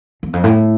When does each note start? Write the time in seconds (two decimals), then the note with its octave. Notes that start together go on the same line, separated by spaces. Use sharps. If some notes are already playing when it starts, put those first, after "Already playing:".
0.23 E2
0.33 F2
0.44 A2